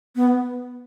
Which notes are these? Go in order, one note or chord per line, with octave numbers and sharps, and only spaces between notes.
B3